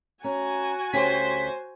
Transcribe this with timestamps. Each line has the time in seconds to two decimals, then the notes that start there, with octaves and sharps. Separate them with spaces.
0.24 C#4 F#4 G#5 A#5
0.93 D2 C#4 G4 C5 B6